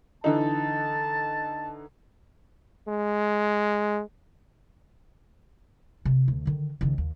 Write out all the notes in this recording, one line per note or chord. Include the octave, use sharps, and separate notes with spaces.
D3 E3 D#4 A5
G#3
C3 F4
D2
D3 D#3
C#2 D#3
D#2